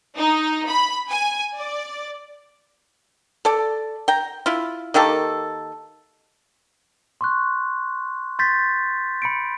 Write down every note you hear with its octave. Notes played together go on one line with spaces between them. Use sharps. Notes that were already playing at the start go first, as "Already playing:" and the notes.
D#4
B5
G#5
D5
A4 D5
G5 A#5
E4 F4
D#3 A#3 G4 A4
C6 C#6 F#6
C6 G6 A6 B6
B5 C#7 D7